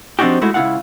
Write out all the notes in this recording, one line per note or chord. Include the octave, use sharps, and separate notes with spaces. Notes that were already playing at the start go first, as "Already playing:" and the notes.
F3 C4 D4 D#4 F#4 G4
G#3 A3 E4 F#4
C#2 C#3 D#4 E4 F5 F#5